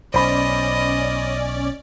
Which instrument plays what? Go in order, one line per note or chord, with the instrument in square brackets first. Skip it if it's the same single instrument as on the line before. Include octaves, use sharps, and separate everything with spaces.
[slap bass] B1 [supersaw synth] C#4 D5 [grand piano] C5 B5 [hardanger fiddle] D#5